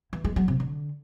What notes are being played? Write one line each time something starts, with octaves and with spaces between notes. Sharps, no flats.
E3
G#3
F#3
C3
D3